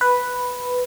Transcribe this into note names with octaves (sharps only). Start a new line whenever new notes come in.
B4